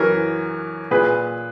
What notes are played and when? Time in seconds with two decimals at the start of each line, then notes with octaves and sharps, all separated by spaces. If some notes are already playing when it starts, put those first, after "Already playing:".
Already playing: F#2 E3 A#4 C#5
0.91 A#2 G#4 B4